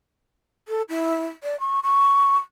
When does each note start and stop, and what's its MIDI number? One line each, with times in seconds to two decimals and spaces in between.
0.68 0.82 69
0.89 1.26 64
1.44 1.59 74
1.60 1.80 85
1.83 2.36 85